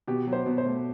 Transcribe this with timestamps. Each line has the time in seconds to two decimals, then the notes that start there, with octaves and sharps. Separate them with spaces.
0.08 B2 G4
0.27 F#3
0.33 C5
0.46 B2
0.58 C5
0.65 A3